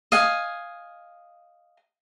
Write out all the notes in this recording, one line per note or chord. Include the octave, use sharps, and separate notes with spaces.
D#5 F5 G#5